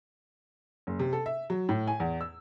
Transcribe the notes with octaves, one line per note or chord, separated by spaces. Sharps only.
F#1
C3
A4
E5
F#3
A2
G#5
E2
E6